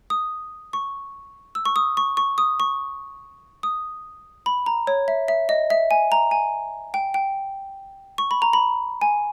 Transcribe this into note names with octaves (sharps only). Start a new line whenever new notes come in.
D#6
C#6
E6
C#6
D#6
C#6
C#6
D#6
C#6
D#6
B5
A#5
C#5
E5
E5
D#5
E5
G#5
A#5
G#5
G5
G5
C#6
B5
A#5
B5
G#5